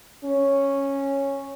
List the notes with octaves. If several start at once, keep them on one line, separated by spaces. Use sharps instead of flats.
C#4